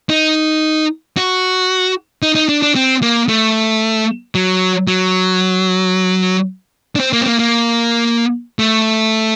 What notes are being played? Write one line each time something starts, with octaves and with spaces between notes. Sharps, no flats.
D#4
F#4
D#4
D#4
D4
D4
C4
A#3
A3
F#3
F#3
D4
C4
A#3
C4
A#3
A#3
A3